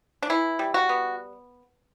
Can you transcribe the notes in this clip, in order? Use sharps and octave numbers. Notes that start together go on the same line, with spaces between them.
D4
E3 E4
G3
F#4
B3